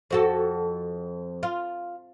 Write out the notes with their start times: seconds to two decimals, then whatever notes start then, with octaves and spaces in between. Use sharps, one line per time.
0.11 F2 F#4 A4
1.43 F4